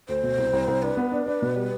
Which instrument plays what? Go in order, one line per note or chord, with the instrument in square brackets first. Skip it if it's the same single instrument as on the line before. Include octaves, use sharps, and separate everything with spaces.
[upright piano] D2 [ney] C5
[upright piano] B2
C2
C2
C2
[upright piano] D4 [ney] B4
[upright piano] B3
D4
D4
B2
G3